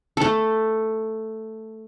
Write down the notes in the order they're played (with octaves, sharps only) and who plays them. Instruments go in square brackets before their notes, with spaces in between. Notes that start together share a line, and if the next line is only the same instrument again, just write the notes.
[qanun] A3 A4